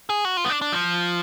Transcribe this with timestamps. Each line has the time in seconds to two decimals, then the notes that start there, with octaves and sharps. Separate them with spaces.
0.09 G#4
0.25 F#4
0.37 F4
0.45 B3
0.50 D4
0.62 D4
0.72 F3